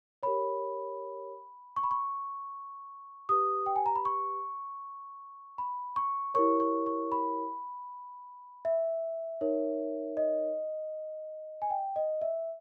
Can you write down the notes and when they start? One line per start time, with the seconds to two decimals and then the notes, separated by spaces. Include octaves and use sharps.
0.23 G4 A#4 C#5 B5
1.76 C#6
1.84 B5
1.91 C#6
3.29 G4 B4 D#6
3.66 G5
3.76 G#5
3.86 A#5
3.96 B5
4.05 C#6
5.58 B5
5.96 C#6
6.34 E4 G4 A#4 C#5 C#6
6.60 C#6
6.86 C#6
7.12 B5
8.65 E5
9.41 D#4 A#4 C#5
10.17 D#5
11.62 G#5
11.70 G5
11.96 D#5
12.22 E5